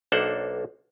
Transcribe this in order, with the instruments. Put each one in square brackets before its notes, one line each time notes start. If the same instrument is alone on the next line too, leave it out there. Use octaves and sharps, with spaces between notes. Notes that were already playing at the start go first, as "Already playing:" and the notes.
[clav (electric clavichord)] B1 A#3 D4 A4 C5 F#5